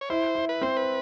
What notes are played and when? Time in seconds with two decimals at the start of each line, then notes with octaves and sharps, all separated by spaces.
0.01 C#5
0.10 E4 C5
0.35 E4
0.49 B4
0.61 C4 C5
0.77 B4